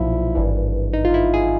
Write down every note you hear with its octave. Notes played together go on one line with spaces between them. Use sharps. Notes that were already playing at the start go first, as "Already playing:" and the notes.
Already playing: B1 A#2 F3 E4
G#1 G2 E3
D#4
F4
E4
G#4